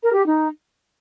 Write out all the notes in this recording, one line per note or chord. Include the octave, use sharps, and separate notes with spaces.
A#4
G4
D#4